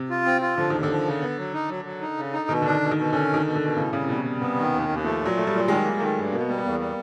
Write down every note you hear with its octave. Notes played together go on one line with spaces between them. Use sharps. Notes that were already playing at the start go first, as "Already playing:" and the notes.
Already playing: C3
F4
C4
F4
D3 F3
D#2 D#3
D3
F3
C#3
B3
F#3
D#4
F#3
F#3
D#4
C#3
D#4
B2 D#3
D3
D4
D#3
B2
D#3
B2
D3 C#4
B2
D#3
B2
D3
B2
A2 C#3
C#3 G3
C3
B2 G3
B2 G3
C3 B3
D#3
D#2
D#2
F3 A3
A#2
F#3
A3
G3
A#2
D#3 G#3
A#3
D#3 A3
G2
B2 A#3
B3
G3 A#3
B3
E2 A#3
G3